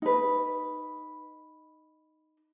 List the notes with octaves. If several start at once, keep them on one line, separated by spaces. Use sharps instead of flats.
D#4 B4